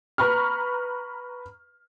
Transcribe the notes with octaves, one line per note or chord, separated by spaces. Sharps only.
B4 A#5 B5 C#6 F6